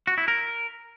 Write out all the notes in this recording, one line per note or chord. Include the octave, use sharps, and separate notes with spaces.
F#4
E4
A#4